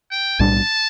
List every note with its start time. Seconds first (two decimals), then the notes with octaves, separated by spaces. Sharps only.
0.11 G5
0.40 B1 A2 G3 D4 A5